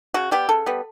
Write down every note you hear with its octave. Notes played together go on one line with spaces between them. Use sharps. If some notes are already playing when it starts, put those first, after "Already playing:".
C#3 F#4
G3 B3 G4
C#3 A4
G3 B3